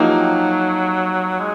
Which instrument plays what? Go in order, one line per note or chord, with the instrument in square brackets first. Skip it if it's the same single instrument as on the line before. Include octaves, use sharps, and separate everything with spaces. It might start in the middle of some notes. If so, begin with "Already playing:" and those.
Already playing: [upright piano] F3 A#3 D#4 G4 [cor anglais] F#3
[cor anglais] G#3